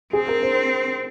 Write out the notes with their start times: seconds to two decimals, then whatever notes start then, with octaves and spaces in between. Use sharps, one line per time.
0.13 C4 G#4
0.28 A#4
0.42 C5